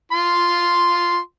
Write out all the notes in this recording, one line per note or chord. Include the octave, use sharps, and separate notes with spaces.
F4 C6